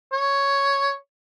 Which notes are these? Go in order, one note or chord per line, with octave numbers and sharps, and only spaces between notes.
C#5